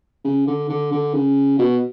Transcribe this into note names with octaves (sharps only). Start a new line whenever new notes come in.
C#3
D3
D3
D3
C#3
B2